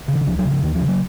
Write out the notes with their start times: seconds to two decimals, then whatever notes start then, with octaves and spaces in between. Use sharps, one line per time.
0.08 C#3
0.14 D#3
0.27 C#2 F3
0.39 F#3
0.45 C#3
0.51 F3
0.63 D#2 D#3
0.75 F3
0.81 C#3
0.88 F#3